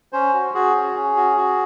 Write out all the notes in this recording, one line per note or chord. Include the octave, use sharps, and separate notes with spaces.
C#4 C5
F#4
F#4 G#4
C#4
C#4
F#4
F#4